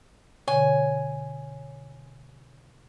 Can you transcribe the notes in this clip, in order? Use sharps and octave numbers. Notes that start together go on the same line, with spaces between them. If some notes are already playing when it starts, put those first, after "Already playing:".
B2 D3 C#5 G#5